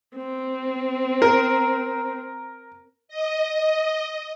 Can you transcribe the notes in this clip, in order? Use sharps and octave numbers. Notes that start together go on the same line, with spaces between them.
C4
A#4
D#5